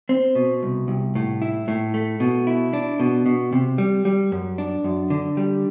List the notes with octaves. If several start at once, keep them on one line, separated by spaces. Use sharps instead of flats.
C4
B2
C2
C2
A2
E4
A2
A3
B2
E4
D4
B2
B2
C3
G3
G3
F#2
D4
F#2
D3
G3